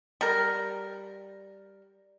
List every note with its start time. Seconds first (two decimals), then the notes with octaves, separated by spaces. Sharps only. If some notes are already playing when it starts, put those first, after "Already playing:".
0.21 G3 A#4